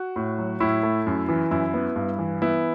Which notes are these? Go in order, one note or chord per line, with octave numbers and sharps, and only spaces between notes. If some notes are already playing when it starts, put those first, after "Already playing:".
Already playing: F#4
A2
F#3
A2 E4
A3
F#2
E3
F#2 E4
B3
G2
E3
B3 E4